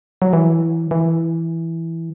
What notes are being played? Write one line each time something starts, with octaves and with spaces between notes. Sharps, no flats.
F#3
E3
E3